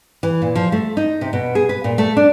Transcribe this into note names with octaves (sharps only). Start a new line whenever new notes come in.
E3
A#2
F3
A3
D#4
C3
B2
G#4
B4
A#2
A3
D4